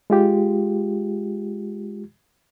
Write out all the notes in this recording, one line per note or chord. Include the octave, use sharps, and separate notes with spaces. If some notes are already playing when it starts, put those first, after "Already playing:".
G#3 F4 G4